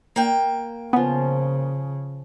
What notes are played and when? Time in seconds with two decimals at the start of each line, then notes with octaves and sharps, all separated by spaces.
0.16 A#3 G5
0.93 C#3 F3 B3 C#4